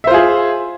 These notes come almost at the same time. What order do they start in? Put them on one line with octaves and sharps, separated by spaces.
E5 C5 F4 G#4